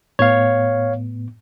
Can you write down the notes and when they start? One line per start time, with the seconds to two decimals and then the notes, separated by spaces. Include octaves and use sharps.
0.19 A2 B3 C#5 F5